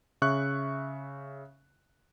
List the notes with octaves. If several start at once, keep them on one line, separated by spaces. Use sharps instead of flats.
C#3 E5 C#6 F#6